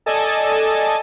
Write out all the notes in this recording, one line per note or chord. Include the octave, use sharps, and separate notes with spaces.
A4 D5 D#5 G#5 A5